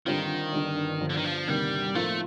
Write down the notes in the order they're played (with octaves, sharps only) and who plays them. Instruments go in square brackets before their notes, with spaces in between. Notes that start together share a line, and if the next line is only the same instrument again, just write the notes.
[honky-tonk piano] G2 D3 G3 C4 F4 [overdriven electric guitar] D#3
[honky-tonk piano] G1 G2 D3 G3
G1 G2 F3
[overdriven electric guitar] D3
D#3
F3
[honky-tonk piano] D2 C3 D#3 A#3 [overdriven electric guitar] G3
[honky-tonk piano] A2 F3 A#3 F4 [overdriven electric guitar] A3